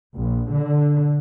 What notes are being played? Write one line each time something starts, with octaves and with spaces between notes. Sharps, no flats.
A#1
D3